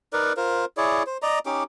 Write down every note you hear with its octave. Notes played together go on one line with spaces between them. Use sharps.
D#4 A#4 B4 D5
F4 A#4 C5
E4 G#4 C#5 D5
C5
D5 D#5 A#5
C#4 D#4 G4 D6